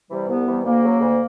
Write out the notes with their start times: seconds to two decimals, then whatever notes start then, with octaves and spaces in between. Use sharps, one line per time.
0.10 C3 E3 G3
0.28 C2 B3
0.46 C3 E3 G3
0.64 D2 A#3
0.82 C#3 F#3
1.00 D2